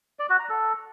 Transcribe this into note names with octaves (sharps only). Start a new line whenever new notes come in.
D5
F#4
A#5
A4